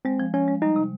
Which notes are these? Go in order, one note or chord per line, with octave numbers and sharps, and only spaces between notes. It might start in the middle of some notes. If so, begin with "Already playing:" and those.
G#3 C4
F3
F3 C#4
G#3
G3 D#4
C3